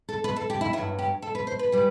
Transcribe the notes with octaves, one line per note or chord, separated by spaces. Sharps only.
A4
B4
A4
G4
E4
G2 F#3 E4
G4
A4
B4
C5
B4
E3 G3